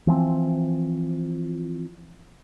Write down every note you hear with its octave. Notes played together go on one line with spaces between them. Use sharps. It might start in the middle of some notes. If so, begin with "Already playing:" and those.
E3 F3 A#3 C4